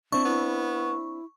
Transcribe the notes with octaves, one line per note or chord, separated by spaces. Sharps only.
C4 D4 E4 C#6
B3 E4